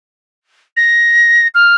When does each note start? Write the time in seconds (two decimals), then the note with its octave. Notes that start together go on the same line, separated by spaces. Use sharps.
0.76 A#6
1.54 F6